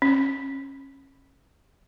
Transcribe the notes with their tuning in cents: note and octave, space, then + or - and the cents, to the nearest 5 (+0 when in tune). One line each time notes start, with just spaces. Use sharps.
C#4 -25